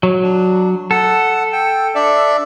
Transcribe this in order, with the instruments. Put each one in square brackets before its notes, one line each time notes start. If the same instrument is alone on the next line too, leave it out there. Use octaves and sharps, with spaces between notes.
[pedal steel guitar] F#3
[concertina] D4
[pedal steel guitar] A4 [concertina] F#5
[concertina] G5
D4 D5 E5